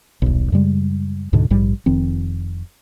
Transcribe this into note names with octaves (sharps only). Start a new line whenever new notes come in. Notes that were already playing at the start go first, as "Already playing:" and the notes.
D#1 B1
F#2 C#3 G3 G#3
C#2 G#2 B2 D3
A#1 G#2 G3
F1 F2 D#3 C4